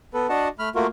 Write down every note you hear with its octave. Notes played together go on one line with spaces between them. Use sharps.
B3 A4 B4
D4 F#4 D#5 F#5 A5
A3 B5 F6
A3 A#3 F4 F#4 A#4